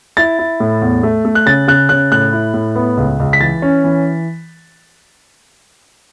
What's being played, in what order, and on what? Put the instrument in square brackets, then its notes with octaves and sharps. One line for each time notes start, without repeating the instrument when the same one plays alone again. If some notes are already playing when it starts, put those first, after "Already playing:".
[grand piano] E4 A6
E4
A2
E2
A3
A3
F#6
C#3 A6
C#3 F#6
C#3 F#6
A2 F#6
E4
A2
B3
C#2
C#2
B6
E3 A6
C#4
E3